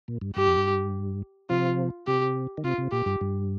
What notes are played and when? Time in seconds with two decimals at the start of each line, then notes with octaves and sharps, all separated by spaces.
0.08 A#2
0.21 G2
0.36 G2 G4
0.46 F2
0.57 G2
1.50 C3 F3 F4
2.06 C3 G4
2.57 D#3
2.64 C3 F4
2.78 C3
2.92 A#2 G4
3.06 G2
3.21 G2